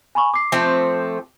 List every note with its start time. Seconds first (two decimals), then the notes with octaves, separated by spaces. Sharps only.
0.15 G#5 B5 C#6
0.34 D6 C7
0.52 F3 A3 C4